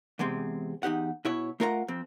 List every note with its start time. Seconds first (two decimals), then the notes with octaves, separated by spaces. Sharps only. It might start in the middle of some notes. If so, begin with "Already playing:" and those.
0.19 E2 C3 G#3 C4
0.83 E2 D#4 G4 F#5
1.25 B2 E4 C#5
1.60 A3 F4 A#4 F#5 G#5 A#5
1.88 F2 C4